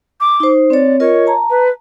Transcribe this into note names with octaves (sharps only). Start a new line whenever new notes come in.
D6
D#4 C5
C4 C#5 D5
F4 A#4 C#5 D#5
A5 A#5
B4